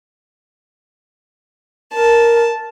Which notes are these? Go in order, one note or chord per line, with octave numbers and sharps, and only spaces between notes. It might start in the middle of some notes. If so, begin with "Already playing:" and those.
A#4 A5